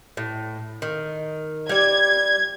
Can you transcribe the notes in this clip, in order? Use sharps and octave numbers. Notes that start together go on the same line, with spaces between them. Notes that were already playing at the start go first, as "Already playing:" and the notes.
A2
D#3
G3 D5 G#6